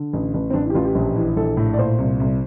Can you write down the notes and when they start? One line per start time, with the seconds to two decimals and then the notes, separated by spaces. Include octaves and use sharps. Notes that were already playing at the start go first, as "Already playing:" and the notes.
Already playing: D3
0.13 A1
0.34 A1
0.50 C4
0.53 A1 D4
0.65 E4
0.70 G4
0.74 A1 F4
0.85 G4
0.95 A#1
1.16 E3
1.36 A#1 A4
1.57 A2
1.73 D5
1.78 A#2 C5
1.98 C2
2.20 C2